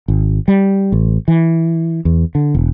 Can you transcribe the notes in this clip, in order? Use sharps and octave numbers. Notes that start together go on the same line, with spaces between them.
G#1
G3
A1
E3
E2
D3
E1